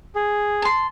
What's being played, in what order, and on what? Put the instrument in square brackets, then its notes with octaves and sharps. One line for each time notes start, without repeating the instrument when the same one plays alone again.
[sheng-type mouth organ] G#4
[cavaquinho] A5 C6